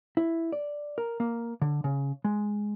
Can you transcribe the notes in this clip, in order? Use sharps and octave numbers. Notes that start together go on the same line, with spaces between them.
E4
D5
A#4
A#3
D3
C#3
G#3